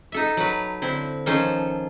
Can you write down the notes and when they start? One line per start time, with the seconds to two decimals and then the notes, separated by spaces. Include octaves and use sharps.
0.12 D#4 A4 E5
0.37 F#3 B4
0.82 D3 C4 E4
1.26 D#3 F3 C#4 A4 C5